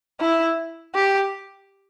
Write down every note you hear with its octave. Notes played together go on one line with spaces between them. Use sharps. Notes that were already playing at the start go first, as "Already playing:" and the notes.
E4
G4